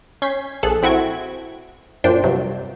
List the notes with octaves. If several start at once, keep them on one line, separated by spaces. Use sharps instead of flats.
C#4 G6 G#6 B6 C7
A#1 G#4 A4 F#6
C4 E4 F#4 G#6 D7
F#2 A#2 F3 D4 C5 G5
G2 C3 F#3